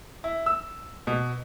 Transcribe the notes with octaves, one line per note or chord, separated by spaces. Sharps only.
E4
E6
B2